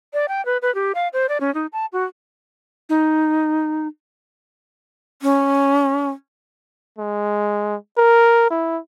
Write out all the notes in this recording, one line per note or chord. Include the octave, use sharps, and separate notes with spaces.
D5
G5
B4
B4
G4
F5
C5
D5
C#4
D#4
A5
F#4
D#4
C#4
G#3
A#4
E4